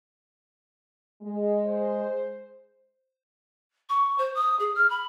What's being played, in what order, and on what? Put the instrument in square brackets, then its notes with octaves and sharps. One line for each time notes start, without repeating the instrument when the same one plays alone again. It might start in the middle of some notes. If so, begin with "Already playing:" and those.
[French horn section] G#3
[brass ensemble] C5
[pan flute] C#6
C5
D#6
G#4
F6
B5